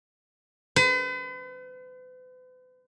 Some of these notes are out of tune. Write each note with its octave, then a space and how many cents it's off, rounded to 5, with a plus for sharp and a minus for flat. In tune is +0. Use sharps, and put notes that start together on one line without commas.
B4 +45